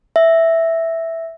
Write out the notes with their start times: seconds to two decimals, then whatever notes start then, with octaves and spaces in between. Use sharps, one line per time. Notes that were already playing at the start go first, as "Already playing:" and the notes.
0.16 E5